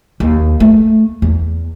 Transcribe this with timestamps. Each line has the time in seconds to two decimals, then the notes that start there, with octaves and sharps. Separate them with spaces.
0.20 D#2
0.60 A3
1.22 E2